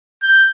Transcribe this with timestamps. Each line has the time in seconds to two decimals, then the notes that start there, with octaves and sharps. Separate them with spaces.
0.23 G6